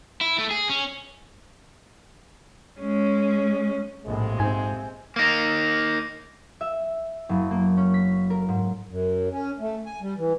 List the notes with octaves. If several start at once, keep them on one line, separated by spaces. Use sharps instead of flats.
E4
A3
G#4
C#4
G#3 C#4
A#1 F2 A2 C3 G#3
G#2 C4 G#5
A#3 D#4
E5
F#1
A#3
C#4
B6
A#4
G#2
F#2
C#4
A3
G#5
G3
E3